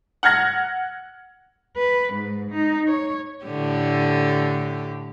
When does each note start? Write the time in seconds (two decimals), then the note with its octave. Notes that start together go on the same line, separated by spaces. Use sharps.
0.23 F#5 F6 G#6 A#6
1.77 B4
2.13 G#2
2.51 D#4
2.87 C#5
3.45 A2 D3 G4